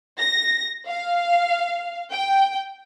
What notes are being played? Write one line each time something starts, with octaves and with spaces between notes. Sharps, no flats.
A#6
F5
G5